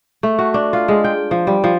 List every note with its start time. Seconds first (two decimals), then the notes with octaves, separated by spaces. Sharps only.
0.23 A3
0.39 F#4
0.54 D4
0.73 F4
0.88 G#3
1.04 G5
1.31 F3
1.47 G3
1.64 F3